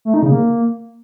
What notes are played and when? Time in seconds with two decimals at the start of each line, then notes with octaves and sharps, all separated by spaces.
0.05 A3
0.14 D#4
0.23 C#3
0.31 A#3